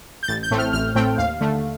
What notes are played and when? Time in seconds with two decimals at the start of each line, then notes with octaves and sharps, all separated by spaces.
0.23 G6
0.28 A1 A6
0.43 G6
0.51 A2 A3 C4
0.58 F6
0.73 A1 F6
0.95 A2 A3 C4 G5
1.18 D#2 F5
1.40 D3 A3